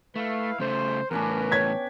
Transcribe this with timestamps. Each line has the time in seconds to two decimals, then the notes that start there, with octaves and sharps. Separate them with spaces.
0.16 A3 E4 B4 F5
0.60 C#3 A3 C5
1.11 E2 A2 B3 C#4 D4 A#4 B4
1.52 C#5 G5 G#6 B6